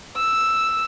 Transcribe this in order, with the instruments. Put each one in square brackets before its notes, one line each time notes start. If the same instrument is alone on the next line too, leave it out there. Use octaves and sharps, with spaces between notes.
[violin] E6